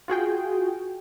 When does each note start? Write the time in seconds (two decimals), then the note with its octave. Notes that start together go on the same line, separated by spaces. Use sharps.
0.08 F4 F#4 G#4 G5